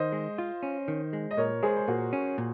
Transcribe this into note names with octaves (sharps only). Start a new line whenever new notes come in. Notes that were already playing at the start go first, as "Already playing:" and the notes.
Already playing: D#3 C5 D#5
G#3
F4
C#4
D#3
G#3
D#5
A#2 A#4 C#5
G#3 G#4 C5
C5
A#2 F#4 A#4
C#4
A#2